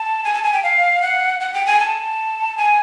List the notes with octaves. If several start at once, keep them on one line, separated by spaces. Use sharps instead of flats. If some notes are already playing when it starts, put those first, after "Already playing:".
Already playing: A5
G#5
A5
G#5
G5
F5
F#5
F#5
G5
G#5
A5
G#5